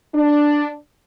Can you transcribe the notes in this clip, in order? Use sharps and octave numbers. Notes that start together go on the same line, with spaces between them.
D4